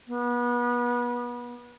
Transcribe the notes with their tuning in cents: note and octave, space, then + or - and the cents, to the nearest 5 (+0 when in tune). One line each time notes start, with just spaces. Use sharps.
B3 -30